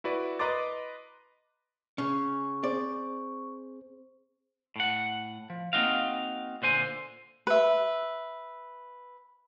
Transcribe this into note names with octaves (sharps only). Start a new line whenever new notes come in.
E4 F#4 B4 D5
B4 D#5 A#5 C6 D6 A6
C#3 C#4 C#6
C4 G#4 C5 D5
A2 F#5
F3
A#3 C4 D#4 F#4 F5
A#2 D3 C5 G#5
B4 E5